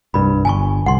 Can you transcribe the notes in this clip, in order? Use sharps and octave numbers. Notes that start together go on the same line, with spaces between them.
C2 G2 B5
G1 G#5 A5 C#6
C2 F#5 C6